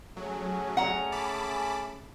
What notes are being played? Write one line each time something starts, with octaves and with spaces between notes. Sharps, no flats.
F#3 A3 C#4 G#4
F#5 A#5
A5 B5 D6